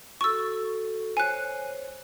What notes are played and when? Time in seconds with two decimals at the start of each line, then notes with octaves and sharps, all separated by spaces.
0.21 F#4 A4 C#6 E6
1.17 C5 C#5 G#5 F#6